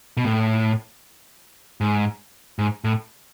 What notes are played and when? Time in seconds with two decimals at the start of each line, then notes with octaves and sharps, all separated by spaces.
0.17 B2
0.25 A2
1.81 G#2
2.59 G#2
2.84 A2